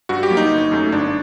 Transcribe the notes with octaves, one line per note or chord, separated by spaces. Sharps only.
G2 F#4
G4
F#3 A#3
D#4
G1
F#2 F#3 A3
G1 D4